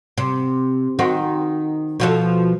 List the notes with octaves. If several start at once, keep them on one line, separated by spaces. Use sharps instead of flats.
C3
D#3 C4 F#4
B2 F3 A4